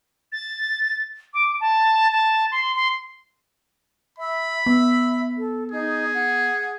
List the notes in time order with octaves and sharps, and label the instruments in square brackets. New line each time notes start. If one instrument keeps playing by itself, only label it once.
[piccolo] A6
D6
A5
A5
C6
C6
[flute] E5 [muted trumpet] B5
[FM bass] B3 [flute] E5
[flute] A4
[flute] D#4 [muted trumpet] G#4
[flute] F#5